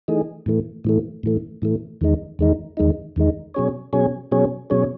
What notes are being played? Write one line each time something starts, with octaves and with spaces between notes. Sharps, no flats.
E3 A3 D#4 G#4
A2 E3 A3
A2 E3 A3
A2 E3 A3
A2 E3 A3
E2 D#3 G#3 D#4
E2 D#3 G#3 D#4
E2 D#3 G#3 D#4
E2 D#3 G#3 D#4
B2 F#3 C#4 G#4 C#5
B2 F#3 C#4 G#4 C#5
B2 F#3 C#4 G#4 C#5
B2 F#3 C#4 G#4 C#5